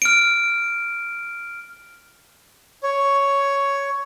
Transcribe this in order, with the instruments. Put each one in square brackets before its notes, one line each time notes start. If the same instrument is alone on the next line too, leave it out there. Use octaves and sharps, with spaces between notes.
[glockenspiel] F6 D7
[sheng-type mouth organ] C#5